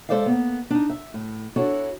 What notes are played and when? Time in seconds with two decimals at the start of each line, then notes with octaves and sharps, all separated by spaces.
0.09 G#3 A4 C5 D5 E5 F5
0.26 A#3 B3
0.71 D4 D#4
0.90 E5
1.14 A2
1.56 D4 E4 F#4 A4 C#5